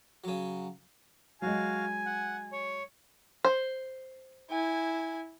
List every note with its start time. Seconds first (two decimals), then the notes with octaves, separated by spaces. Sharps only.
0.24 C#3 F#3
1.42 F#3 G#3 F#4 F5 G#5
2.05 F#5
2.52 C#5
3.44 C5
4.51 E4 G#5